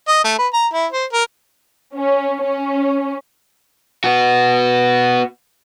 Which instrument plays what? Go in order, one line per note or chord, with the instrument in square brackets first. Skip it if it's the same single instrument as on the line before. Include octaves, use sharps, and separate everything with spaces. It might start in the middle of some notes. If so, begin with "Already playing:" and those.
[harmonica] D#5
A3
B4
A#5
E4
C5
A#4
[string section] C#4
C#4
[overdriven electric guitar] B3 F#4